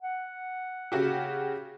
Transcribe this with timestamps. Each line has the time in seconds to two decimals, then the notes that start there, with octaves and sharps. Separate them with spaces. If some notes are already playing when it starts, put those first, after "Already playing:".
0.02 F#5
0.92 C#3 F#4 G4